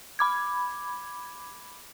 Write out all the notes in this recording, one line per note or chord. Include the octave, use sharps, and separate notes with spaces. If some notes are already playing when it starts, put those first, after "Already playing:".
B5 D6 G#6